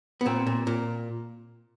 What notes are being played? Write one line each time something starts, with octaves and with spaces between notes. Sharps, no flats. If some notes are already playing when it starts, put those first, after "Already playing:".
B3
A#2 C4
A#2
A#2